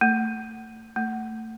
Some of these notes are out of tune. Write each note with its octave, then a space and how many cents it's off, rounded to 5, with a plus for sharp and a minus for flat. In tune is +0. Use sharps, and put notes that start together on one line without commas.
A3 +30
A3 +25